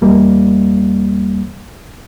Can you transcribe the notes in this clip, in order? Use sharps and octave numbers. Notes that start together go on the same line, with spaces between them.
E2 G3 A#3